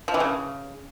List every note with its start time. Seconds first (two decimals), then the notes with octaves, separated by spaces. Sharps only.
0.08 F3
0.14 E3
0.20 C#3